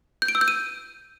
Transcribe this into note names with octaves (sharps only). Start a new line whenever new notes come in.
G6
D7
E6
G6
D#7